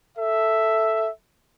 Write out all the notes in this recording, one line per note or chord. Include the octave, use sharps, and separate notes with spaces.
A4 E5